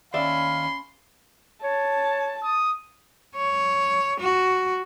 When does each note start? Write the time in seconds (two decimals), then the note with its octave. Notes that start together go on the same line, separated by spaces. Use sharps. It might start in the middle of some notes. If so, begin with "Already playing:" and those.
0.14 D#2 C#4 D5 E5 F5 B5 C6
1.63 C#5 A5
2.43 D#6
3.36 C#5
4.20 F#4